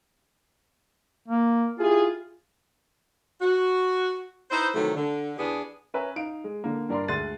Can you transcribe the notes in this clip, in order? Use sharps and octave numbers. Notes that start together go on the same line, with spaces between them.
A#3
E4 F4 G4 G#4
F#4
D#4 E4 B4 C5
C3 D#3 E3 F#3 A3
D3
E2 E3 B3 D4 G4 G#4
C#4 B4 E5 G#5 A#5
D#4 F5 D7
G#3
D3 A#3
G2 D4 A#4 D5 C6
D2 G#3 C6 F#6 A6 D#7